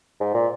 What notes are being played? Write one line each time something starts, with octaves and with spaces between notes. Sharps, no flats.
G#2
A#2